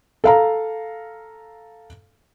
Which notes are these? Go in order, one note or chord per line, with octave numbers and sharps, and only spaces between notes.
A4 F5 A#5